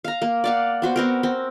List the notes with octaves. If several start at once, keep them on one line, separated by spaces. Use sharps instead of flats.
F5 A#5
A#3
D5 F5 F#5
B3 F#4 C5
B3 C4 A#4
C4